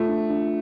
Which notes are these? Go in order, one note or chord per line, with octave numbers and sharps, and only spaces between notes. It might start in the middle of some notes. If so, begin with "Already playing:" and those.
Already playing: A3 F4
D4
D4